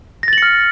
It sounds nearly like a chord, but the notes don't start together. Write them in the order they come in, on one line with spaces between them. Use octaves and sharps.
A#6 A6 F#7 C#7 F6